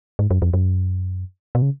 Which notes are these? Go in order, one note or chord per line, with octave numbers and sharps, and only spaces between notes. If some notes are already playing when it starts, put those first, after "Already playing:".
G#2
F#2
F2
F#2
B2
C#3